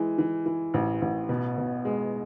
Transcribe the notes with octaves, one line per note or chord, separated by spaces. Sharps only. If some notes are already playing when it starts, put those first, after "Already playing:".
Already playing: E3 G#3
E3
E3
A1
A1
B2
B2
G#3